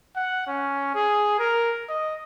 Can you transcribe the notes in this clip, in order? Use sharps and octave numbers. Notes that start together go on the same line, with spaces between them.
F#5
C#4
G#4
A#4
D#5